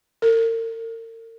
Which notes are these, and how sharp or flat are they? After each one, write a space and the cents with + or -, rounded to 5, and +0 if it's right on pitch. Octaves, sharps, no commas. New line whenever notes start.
A#4 -40